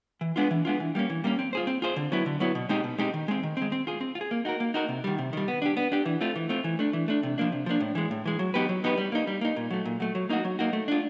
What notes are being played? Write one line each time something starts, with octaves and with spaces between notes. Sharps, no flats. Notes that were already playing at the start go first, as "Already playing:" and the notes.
E3
G#3 B3 D4 F4
E3
G#3 B3 D4 F4
E3
G3 A#3 C#4
E3
G3 A#3 C#4
C4
F4 G#4 C5
C4
F4 G#4 C5
D3
F#3 B3 E4
D3
F#3 B3 E4
B2
G#3 C4 D#4 G4
B2
G#3 C4 D#4 G4
D#3
G#3 C4
D#3
G#3 C4
C4
F4 G#4
C4
F4
G#4
A#3
D#4 F#4 A#4
A#3
D#4 F#4 A#4
C3
D#3 G3
C3
D#3 G3
B3
D4 G4
B3
D4 G4
E3
A3 C4 F4
E3
A3 C4 F4
E3
A3 D4
E3
A3 D4
C3
F3 A#3 D4
C3
F3 A#3 D4
A2
E3 G#3
A2
E3 G#3
F#3
B3 D#4 G4 B4
F#3
B3 D#4 G4 B4
G3
A#3 D#4
G3
A#3 D#4
A#2
F#3 A3
A#2
F#3 A3
F#3
A#3 D#4 F#4
F#3
A#3 D#4 F#4
A3
D4 F4